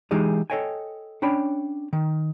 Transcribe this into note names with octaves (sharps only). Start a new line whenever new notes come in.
E3 G#3 D#4 G4 G#4
A4 C5 C#5 D#5 G5 G#5
C#4 D4 C#5 G5 B5
D#3